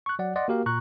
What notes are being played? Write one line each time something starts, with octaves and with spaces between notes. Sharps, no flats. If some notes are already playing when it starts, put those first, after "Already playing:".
C#6 F#6
F#3 D5 F#5
D5 D#5 F#5 C6
A#3 F#4 G4 A#4 F5
A#2 A#5 C#6 F#6